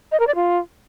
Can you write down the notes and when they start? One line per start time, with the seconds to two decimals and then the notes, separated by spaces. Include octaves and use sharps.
0.12 D#5
0.20 A#4
0.27 D5
0.35 F4